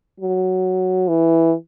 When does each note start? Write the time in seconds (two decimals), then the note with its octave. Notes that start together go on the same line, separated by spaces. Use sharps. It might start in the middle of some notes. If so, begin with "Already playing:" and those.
0.20 F#3
1.08 E3